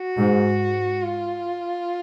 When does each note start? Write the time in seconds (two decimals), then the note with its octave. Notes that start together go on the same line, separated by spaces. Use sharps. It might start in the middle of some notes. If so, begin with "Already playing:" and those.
Already playing: F#4
0.19 G#2
1.03 F4